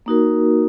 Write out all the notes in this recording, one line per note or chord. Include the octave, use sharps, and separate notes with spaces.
A#3 D#4 F#4 A#4